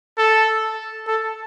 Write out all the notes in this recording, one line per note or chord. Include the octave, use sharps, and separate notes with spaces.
A4
A4